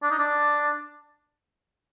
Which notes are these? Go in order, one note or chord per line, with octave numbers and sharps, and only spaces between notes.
D4
D#4
D4